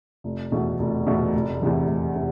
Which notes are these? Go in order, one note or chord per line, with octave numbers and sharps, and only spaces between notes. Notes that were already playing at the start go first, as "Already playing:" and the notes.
F1
E2 B2 A3
F1
E2 B2 A3
F1
E2 C3 E3
F1
C3